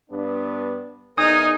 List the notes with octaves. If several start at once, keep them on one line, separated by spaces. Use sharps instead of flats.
G2 B3 D4
E2 D#4 G#4 A#4 G#5 D#6